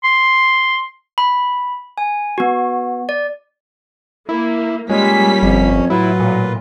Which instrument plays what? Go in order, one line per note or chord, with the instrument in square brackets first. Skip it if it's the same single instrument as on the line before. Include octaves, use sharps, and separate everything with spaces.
[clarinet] C6
[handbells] B5
G#5
B3 F#4
D5
[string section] A#3 [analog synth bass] E4
[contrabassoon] A#2 [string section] G3 B6 [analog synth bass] G#3 [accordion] A#3 C#4 C#5
[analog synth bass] G1 [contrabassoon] F2
[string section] A2 [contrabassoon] F#3 [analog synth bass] E4 [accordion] F4 B4
[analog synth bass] A#2